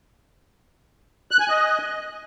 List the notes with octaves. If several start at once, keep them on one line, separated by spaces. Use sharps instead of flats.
F#6
G#5
D#5